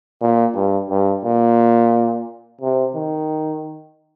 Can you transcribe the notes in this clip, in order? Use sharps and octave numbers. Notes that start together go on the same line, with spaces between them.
A#2
G2
G2
A#2
C3
D#3